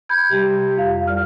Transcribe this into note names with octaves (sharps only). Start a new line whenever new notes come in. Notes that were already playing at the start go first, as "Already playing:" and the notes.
B5 G6 G#6
C3 G3
F2 F5
C2 F6